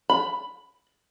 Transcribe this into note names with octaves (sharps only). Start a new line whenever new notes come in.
B5